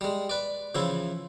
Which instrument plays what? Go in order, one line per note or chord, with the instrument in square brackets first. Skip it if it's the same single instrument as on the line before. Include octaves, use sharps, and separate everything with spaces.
[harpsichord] G3 G#3
B4 D5
C#3 E3 F3 E4